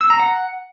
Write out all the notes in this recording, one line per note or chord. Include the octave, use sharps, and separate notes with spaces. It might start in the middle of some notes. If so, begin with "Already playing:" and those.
E6
A#5
F#5